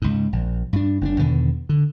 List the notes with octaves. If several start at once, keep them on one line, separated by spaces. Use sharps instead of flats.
C#2 G#2
A#1
G2 D4
F#1 C#4 D4
E2 B2 D3 D#3
D3